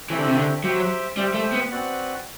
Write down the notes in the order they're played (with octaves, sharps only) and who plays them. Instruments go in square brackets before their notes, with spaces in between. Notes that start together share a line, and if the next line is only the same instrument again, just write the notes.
[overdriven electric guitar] E3 [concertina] A3 C4 E4 G4
[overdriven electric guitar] D3
C3
D3
[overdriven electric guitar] F#3 [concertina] G4 C5 E5 G5
[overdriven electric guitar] G3 [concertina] G4 C5 E5 G5
[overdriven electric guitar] A3
B3
[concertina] C4 F#4 B4 D5 F#5